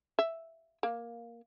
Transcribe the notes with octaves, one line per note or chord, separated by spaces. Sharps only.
E5
A#3